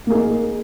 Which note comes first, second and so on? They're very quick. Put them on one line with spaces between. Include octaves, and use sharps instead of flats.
A#3 G#4 D#4